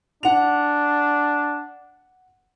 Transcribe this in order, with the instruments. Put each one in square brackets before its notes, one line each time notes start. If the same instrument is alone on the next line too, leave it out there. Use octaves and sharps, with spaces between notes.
[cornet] D4 [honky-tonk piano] F#5 F7